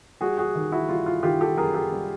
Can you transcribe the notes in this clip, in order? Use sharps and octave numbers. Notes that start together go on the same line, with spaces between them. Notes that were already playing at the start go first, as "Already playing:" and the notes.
G3 F#4 G#4
F#4 G#4
D#3
E4 F#4
G3 F4
F4
D#3 F4 G4
G4 A4
F#2 G#4 A#4
G4 A4
G3